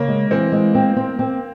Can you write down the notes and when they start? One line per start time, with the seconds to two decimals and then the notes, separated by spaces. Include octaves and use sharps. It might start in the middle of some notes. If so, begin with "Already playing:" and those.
Already playing: C#3 A#3
0.08 G#3
0.31 E3 C4
0.52 G#3
0.75 C4
0.96 C4
1.19 C4